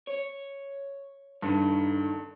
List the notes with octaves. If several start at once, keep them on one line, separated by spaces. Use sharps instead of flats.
C#5
G2 D3 D#3